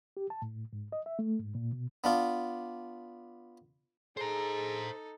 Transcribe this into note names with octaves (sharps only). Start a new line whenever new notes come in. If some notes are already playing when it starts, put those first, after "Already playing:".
G4
A5
A2
G#2
D#5
E5
A3
G#2
A#2
B2
B3 D4 F4
D#4 G#4 A4 C5 A#5